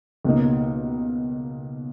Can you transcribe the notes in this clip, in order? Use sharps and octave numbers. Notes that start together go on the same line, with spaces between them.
C#2 B2 A#3 D#4